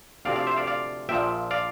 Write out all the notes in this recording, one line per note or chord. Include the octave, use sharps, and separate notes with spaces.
D2 C3 F3 C4 D5 F5
D5 F5
C5 E5
D5 F5
D5 F5
A#1 A#2 F3 E5 G5
D5 F5